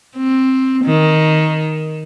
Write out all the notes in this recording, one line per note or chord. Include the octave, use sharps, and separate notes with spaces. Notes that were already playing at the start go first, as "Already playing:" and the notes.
C4
D#3